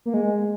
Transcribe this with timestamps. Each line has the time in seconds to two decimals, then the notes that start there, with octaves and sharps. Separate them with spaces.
0.06 A#3
0.14 G#3